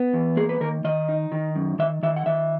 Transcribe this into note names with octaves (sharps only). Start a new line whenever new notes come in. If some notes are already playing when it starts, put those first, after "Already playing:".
Already playing: B3
E2
A#3 G#4
B4
D#3 A#4
D#3 D#5
D#4
D#3
F#2
D#3 E5
D#3 E5
F#5
D#3 E5